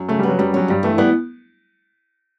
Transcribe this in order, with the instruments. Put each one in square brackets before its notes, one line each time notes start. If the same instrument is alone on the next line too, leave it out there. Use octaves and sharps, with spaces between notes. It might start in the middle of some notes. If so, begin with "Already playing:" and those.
Already playing: [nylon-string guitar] F#2
[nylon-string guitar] C#3 [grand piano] A3
[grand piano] G3 [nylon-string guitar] B3
[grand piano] F#3
[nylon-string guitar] F#2 [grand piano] G3
[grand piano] F#3 [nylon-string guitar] C#4
[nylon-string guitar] G2 [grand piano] G3
[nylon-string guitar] E3 [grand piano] A3
[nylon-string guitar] G3 [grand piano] B3